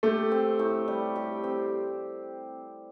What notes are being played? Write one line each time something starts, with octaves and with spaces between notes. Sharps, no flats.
A3 G4
C4
A2
G3
G4
C4